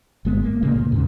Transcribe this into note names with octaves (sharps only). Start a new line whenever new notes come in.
G1 G#3 B3
A#3
A#2 C#3 A#3
D2 A#2
E2 G#2 C#3